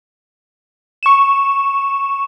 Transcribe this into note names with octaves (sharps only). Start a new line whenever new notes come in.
C#6 E7